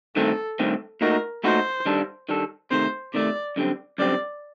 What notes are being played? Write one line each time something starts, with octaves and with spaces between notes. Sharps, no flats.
G2 D#3 A3 C4 A4
G2 D#3 A3 C4
A#2 A3 D#4 F#4 A#4
A#2 A3 D#4 F#4 C5
D#3 G3 D4 A4
D#3 G3 D4 A4
C3 D#3 A3 C5
C3 D#3 A3 D5
F#2 D3 G3 C4
F#2 D3 G3 C4 D5